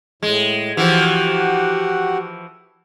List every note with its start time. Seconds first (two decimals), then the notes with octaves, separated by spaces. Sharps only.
0.23 A2 G#3
0.77 E3 F3 F#4 G4 F#5